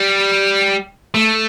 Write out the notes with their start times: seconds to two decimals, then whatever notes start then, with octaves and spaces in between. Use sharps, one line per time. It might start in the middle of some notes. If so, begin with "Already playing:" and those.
Already playing: G3
1.14 A3